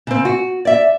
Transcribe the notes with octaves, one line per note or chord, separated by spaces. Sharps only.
C#3 C4
F#4
D5 E5